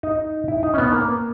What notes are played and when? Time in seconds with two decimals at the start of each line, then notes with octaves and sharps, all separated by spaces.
0.03 D#4
0.48 E4
0.63 D#4
0.74 C#4
0.78 B3
0.93 A#3